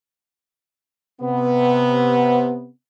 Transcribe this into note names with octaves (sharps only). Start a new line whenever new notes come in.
C3 B3